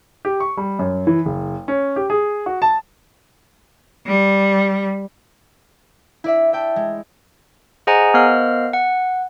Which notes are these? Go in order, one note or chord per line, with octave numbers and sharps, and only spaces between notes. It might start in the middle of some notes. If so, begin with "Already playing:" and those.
G4
C#6
G3
F#2
E3
F#1
C#4
G4
G#4
F#4
A5
G3
E4 D5 E5
E5 G5 A5
G#3
G#4 C5 D#5 F#5 G#5 A#5
B3 A#4 C5 D#5 F5 F6
F#5